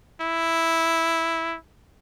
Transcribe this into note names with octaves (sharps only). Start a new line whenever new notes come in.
E4